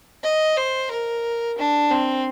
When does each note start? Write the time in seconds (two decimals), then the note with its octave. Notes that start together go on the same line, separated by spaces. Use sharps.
0.24 D#5
0.57 C5
0.91 A#4
1.59 D4
1.91 C4